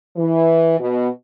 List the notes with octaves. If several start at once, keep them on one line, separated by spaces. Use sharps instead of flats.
E3
B2